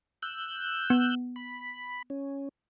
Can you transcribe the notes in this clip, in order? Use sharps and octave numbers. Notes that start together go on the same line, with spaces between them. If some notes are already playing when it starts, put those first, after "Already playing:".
E6 F#6 G6
B3
B5
C#4